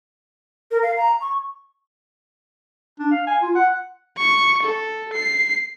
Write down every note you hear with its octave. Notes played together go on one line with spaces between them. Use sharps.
A#4
F5
A#5
C#6
D4
F5
G#5
F4
F#5
C#6
A4
C7